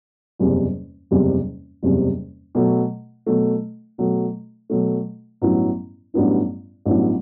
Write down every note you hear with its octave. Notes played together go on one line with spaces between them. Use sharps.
F#1 E2 C3 G3
F#1 E2 C3 G3
F#1 E2 C3 G3
B2 F#3 A3
B2 F#3 A3
B2 F#3 A3
B2 F#3 A3
A1 G2 F#3 B3 E4
A1 G2 F#3 B3 E4
A1 G2 F#3 B3 E4